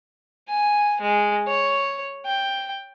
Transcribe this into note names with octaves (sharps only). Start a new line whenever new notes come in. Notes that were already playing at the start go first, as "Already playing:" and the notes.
G#5
G#3
C#5
G5